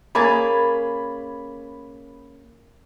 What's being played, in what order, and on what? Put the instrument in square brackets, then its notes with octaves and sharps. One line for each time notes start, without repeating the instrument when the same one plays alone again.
[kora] A#3 C#4 G#4 [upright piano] B5 G#6 A6